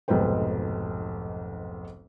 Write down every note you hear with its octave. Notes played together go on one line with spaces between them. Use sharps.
F1 B1 G#2 B4 C5 G5